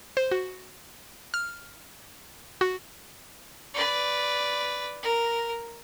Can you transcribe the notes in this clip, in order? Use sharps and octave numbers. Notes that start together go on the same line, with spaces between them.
C5
F#4
F6
F#4
B4 D5
A#4